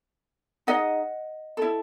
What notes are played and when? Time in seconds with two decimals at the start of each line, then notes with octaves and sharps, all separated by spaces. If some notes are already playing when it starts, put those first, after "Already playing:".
0.67 D#4 G#4 D#5 F#5
1.57 E4 A4